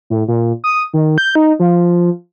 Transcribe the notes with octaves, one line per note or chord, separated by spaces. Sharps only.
A2
A#2
D#6
D#3
G6
D#4
F3